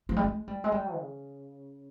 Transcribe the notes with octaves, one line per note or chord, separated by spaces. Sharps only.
F3
G3
G#3
G3
G#3
G3
C#3